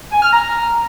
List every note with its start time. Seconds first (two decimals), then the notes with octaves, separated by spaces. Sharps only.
0.12 G#5
0.22 F6
0.33 A#5